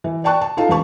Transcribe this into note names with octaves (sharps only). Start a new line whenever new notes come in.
E3
D5 G5 A5 C#6 F#6
A5
D#4 F4 A4 F5 A5
E1 A1 B4 A5 C#6